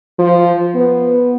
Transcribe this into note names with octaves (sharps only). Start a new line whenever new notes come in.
F3
B3